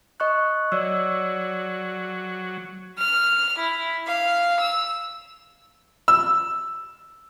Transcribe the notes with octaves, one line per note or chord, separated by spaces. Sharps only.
D#5 C#6 F#6
F#3 C#5 D5 E6
F6
E4
F5
E6
E6